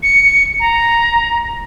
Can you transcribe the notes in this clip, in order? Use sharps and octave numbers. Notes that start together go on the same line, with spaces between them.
C#7
A#5